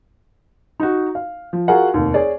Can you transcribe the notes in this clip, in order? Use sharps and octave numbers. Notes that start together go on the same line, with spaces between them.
D#4 F#4
F5
F3
F4 F#4 G#4 A#4 F#5
F1 D#2
G#4 C#5 D5